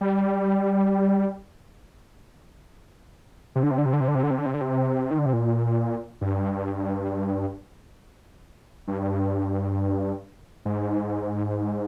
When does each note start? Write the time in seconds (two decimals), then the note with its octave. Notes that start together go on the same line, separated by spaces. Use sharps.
0.01 G3
3.56 C3
3.63 D3
3.71 C3
3.78 D3
3.86 C3
3.93 D3
4.00 C3
4.08 D3
4.15 C3
4.23 D3
4.31 C3
4.38 D3
4.46 C3
4.54 D3
4.61 C3
5.11 D#3
5.18 D3
5.26 C3
5.33 A#2
6.21 G2
8.88 G2
10.65 G#2